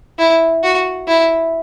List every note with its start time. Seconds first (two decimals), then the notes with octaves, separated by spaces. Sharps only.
0.18 E4
0.63 F#4
1.08 E4